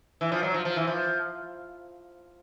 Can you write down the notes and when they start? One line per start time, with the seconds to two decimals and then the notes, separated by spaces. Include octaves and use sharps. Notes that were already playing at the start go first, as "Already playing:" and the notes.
0.21 E3
0.32 F3
0.43 F#3
0.54 F3
0.65 F3
0.76 E3
0.87 F3